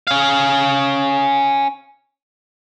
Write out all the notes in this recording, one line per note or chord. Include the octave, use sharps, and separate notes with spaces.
C#4 F5